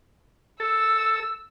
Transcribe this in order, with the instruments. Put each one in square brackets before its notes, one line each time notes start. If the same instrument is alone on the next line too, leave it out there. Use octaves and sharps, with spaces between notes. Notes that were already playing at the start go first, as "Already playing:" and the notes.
[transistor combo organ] A4 [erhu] E6